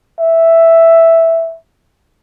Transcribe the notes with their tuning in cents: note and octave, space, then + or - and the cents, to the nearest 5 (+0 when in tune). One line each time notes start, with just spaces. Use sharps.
E5 +0